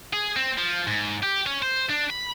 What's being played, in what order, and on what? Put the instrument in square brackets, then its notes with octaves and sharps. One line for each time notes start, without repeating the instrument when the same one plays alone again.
[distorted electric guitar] G#4
C4
F3
G#2
G4
C#4
C5
D4
B5